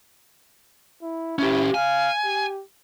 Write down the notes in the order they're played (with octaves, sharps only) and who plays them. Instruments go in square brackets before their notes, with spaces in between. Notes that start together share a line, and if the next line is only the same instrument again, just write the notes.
[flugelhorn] E4
[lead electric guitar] C#4 G4 [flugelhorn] E4
[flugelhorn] F5 [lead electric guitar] G#5
[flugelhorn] G4